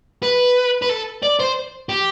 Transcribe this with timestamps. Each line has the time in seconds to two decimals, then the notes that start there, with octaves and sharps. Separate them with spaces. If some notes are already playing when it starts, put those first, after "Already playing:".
0.23 B4
0.82 B4
0.89 A4
1.23 D5
1.40 C5
1.89 G4